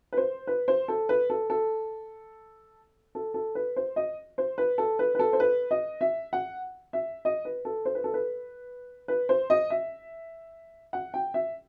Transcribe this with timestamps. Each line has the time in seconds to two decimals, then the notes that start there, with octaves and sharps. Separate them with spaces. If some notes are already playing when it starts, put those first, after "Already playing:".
0.12 B4
0.17 C5
0.47 B4
0.68 C5
0.88 A4
1.09 B4
1.30 A4
1.50 A4
3.15 A4
3.34 A4
3.55 B4
3.76 C5
3.96 D#5
4.38 C5
4.58 B4
4.78 A4
4.99 B4
5.15 B4
5.19 A4
5.33 C5
5.40 B4
5.71 D#5
6.01 E5
6.33 F#5
6.93 E5
7.25 D#5
7.45 B4
7.65 A4
7.85 C5
7.95 B4
8.04 A4
8.14 B4
9.08 B4
9.29 C5
9.50 D#5
9.70 E5
10.93 F#5
11.14 G5
11.34 E5